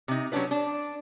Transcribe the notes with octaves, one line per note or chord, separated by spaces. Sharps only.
C3 D#4
F#3 G3 C#4 D4 F4 B4
D4